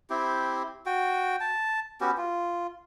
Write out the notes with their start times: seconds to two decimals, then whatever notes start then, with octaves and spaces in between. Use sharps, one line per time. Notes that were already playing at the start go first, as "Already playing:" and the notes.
0.10 C4 E4 G4
0.86 F#4 G5
1.41 A5
2.01 B3 C#4 F#4 G4
2.17 F4